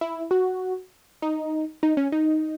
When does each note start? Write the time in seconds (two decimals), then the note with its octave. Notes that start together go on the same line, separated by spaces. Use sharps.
0.01 E4
0.31 F#4
1.22 D#4
1.83 D#4
1.97 C#4
2.12 D#4